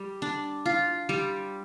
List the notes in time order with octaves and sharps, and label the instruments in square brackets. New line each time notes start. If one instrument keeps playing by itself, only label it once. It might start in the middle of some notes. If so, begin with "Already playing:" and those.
Already playing: [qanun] G3
D4
F4
G3